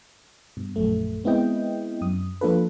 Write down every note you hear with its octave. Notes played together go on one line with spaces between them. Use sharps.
G2 B2
A#1 F#2 A3
G#3 B3 C4 E4 D#5 G5
F#2 D#6
F3 A#3 D4 F4 A4 B4